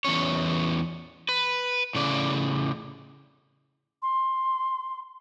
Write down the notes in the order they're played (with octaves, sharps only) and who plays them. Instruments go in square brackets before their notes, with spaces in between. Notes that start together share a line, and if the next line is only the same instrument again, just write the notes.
[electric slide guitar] E2 G2 C#4 C#5
B4
A2 C#3 D5
[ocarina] C6